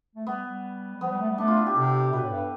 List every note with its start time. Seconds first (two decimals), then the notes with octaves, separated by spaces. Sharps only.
0.15 A3
0.27 G3 B3
0.45 G3
0.96 G3
1.01 F3 B3
1.10 G3
1.20 A3
1.29 G3
1.38 A3 D4
1.48 F4
1.57 E4
1.66 G4
1.76 C3 A4
2.13 B2 B4
2.23 A2
2.31 G2